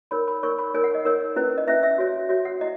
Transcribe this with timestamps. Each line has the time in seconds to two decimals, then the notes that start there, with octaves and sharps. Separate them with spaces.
0.11 D#4 A#4 C#5 B5
0.28 B5
0.43 D#4 A#4 C#5 C#6
0.59 B5
0.74 D#4 A#4 C#5 G#5
0.84 F#5
0.95 D#5
1.05 D#4 A#4 C#5
1.36 C#4 E4 B4
1.58 D#5
1.67 C#4 E4 B4 E5
1.83 E5
1.98 F#4 C#5
2.29 F#4 C#5 E5
2.45 F#5
2.61 E4 D#5